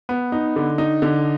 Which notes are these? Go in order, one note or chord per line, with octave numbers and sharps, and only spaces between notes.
B3
D#4
D3
D#4
D3